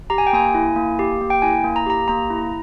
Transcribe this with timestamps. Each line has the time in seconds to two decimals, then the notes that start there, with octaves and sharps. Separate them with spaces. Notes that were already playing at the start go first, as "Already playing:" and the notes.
0.10 G4 A#5
0.18 G#5
0.27 G5
0.33 A#3 G#5
0.55 E4
0.76 A#3
0.99 G4
1.21 A#3
1.30 G5
1.42 E4 G#5
1.64 A#3
1.76 A#5
1.86 G4 A#5
2.08 A#3 A#5
2.30 E4